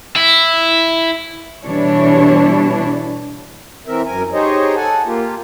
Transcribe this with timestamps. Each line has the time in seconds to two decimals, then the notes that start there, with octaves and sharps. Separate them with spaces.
0.16 E4
1.64 B2 E3 G3 D4 E4 C#5
3.87 E3 C4 A#4 E5
4.06 F#2 A#4 G#5
4.33 D#4 G4 G#4 C5 C#5 D#5
4.76 A4 F#5 G#5 A5
5.06 A#3 F4 G4